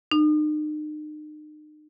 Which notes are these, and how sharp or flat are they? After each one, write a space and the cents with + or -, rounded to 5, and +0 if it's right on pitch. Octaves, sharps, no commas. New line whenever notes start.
D#4 -40